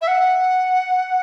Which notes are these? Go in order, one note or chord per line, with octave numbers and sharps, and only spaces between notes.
E5
F#5